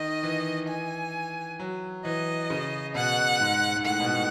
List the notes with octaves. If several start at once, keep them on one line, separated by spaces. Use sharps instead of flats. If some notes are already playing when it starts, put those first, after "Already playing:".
Already playing: D#3 D#5
E3
G#5
F#3
E3 D#5
C#3
B2 F#5
G#2
G#2
A2 F#5
B2
A2